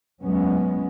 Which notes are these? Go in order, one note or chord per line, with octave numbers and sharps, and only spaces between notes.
E2 F#3 G#3 B3 C#4